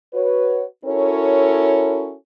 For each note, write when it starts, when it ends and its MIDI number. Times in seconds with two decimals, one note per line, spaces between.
0.14 0.63 66
0.14 0.63 71
0.14 0.63 73
0.85 2.14 61
0.85 2.14 64
0.85 2.14 66
0.85 2.14 69
0.85 2.14 70
0.85 2.14 73